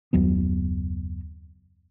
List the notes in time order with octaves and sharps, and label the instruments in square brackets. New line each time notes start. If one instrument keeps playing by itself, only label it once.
[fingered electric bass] F#1 D#2 F#3 B3